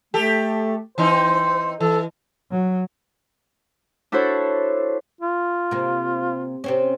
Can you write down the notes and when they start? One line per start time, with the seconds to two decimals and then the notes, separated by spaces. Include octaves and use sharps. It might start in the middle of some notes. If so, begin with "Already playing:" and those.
0.14 A3 G4 A4
0.98 E3 C4 D#4 C5
1.80 E3 A4
2.51 F#3
4.12 D4 E4 F#4 A4 C5 C#5
5.21 F4
5.71 C3 A#3
6.64 C3 C4 C#4